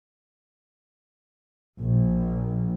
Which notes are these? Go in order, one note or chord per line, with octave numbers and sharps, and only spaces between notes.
A#1